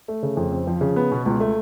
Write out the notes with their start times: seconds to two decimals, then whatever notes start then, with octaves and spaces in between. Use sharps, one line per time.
0.08 A3
0.23 C#3
0.37 F2
0.52 C4
0.67 F3
0.81 C#3
0.96 B3
1.11 B2
1.26 C#2
1.40 A3